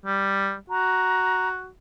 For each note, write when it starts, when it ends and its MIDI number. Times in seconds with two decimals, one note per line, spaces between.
0.05 0.55 55
0.70 1.69 66
0.70 1.48 82